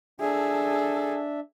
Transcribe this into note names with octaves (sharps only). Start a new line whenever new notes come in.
D4 G#4 A4 E5